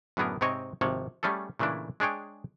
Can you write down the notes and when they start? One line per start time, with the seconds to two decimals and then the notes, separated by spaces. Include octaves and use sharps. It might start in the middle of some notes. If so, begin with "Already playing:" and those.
0.17 F#2 A2 D3 B3 G#4 A#4
0.41 G#2 C3 C4 C#5 D#5 G5
0.81 G#1 C3 F3 C#5
1.23 G3 A3 C#4 G#4 A4
1.59 A#2 C#3 E3 A3 D4 E4
2.00 G#3 D4 G#4 C#5 G5